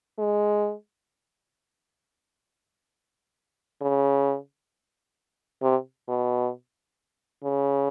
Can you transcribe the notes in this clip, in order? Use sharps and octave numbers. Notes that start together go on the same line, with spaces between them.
G#3
C#3
C3
B2
C#3